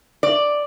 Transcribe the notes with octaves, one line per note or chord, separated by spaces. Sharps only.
D5